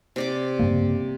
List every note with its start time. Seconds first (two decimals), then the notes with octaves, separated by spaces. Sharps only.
0.16 C3 D5 D6
0.59 G2 C#3 A#3